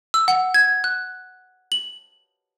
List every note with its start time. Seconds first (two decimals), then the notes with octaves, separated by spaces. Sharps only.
0.14 E6
0.28 F#5
0.54 G#6
0.84 F#6
1.72 F#7